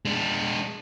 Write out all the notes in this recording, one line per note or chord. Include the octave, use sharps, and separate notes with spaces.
G#3 D4